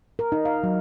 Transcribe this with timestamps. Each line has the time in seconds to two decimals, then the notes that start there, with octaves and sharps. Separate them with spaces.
0.19 A#4
0.32 D#4
0.45 F5
0.64 F#3